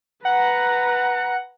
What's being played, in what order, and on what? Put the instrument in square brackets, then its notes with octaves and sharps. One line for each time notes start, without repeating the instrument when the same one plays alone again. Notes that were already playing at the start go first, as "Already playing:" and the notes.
[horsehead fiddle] B4 A#5 [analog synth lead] F#5